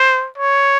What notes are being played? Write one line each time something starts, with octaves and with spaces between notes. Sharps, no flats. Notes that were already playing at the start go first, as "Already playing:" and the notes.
Already playing: C5
C#5